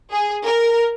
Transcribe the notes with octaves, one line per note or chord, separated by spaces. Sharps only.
G#4
A#4